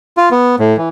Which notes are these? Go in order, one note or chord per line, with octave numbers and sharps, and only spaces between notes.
F4
B3
A2
E3